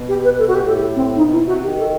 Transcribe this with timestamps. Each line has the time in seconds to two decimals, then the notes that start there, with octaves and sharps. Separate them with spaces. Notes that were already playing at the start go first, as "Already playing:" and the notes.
Already playing: B2
0.08 G4
0.24 B4
0.39 A4
0.48 F#4
0.55 A2 G4
0.66 A4
0.75 G4
0.96 C4
1.16 B2 D#4
1.32 E4
1.37 C3
1.47 F#4
1.58 D#3
1.64 G4
1.78 A4